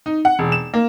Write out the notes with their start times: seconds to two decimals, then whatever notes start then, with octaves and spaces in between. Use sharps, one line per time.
0.06 D#4
0.25 F#5
0.39 E1
0.52 E7
0.74 A#3